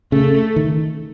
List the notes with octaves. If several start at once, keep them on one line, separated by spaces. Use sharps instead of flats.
C#3 A3
D#3